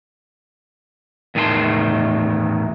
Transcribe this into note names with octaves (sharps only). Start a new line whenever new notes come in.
E2 A2 D#3 G#4 A5 C6